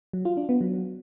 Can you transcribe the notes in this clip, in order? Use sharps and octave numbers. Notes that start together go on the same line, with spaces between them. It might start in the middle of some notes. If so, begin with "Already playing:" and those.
F#3
F4
D4
B3
F#3